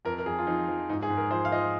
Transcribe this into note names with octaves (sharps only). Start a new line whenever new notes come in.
F2 A#4
A#4
F2 G#4
F4
F3 D#4
F3
G#2 D#4
G#4
G#2
A#4
F3 C5
F5
F3 D#5